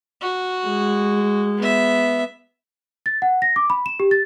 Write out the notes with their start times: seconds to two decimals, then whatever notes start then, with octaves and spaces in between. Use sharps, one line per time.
0.21 F#4
0.68 G#3
1.58 B3 E5
3.06 A6
3.22 F#5
3.42 A#6
3.56 D6
3.70 B5
3.86 E7
4.00 G4
4.11 A6